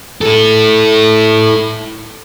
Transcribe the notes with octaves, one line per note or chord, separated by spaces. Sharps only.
E4 A4